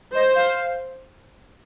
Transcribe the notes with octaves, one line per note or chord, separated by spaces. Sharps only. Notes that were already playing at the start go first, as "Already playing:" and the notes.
C5 D#5
F5